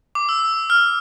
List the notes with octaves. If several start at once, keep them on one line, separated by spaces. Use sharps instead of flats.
D6
E6
F6